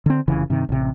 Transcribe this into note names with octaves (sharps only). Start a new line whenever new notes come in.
D3 C4
F1 C#3 E3
G2 C3 D#3
A1 C3